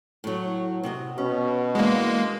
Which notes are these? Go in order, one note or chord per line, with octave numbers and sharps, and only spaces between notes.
A2 F#3
C3 F#4 D#5
B2 C#4
E3 G#3 A#3 D4